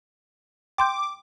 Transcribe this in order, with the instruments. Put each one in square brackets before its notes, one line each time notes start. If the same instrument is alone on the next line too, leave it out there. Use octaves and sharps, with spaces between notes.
[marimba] G5 C6 G6 [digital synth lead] D6